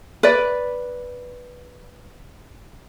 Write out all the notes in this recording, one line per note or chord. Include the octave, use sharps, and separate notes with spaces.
B4 D5